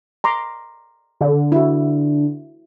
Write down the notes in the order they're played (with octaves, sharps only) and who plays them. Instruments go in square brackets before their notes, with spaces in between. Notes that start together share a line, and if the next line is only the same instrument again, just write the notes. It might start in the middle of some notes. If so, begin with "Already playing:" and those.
[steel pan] A#5 C6 D6
[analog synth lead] D3
[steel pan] E4 F#4